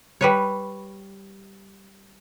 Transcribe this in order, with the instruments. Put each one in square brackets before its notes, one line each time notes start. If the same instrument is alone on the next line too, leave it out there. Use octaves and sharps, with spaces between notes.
[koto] G3 B4 C#5